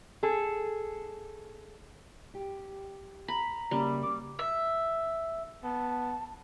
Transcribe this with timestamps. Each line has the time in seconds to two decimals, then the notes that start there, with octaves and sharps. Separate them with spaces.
0.23 G#4 A4
2.35 G4
3.28 A#5 B5
3.71 C#3 G3 A#3 C#4
4.03 D6
4.39 E5
5.64 B3 A5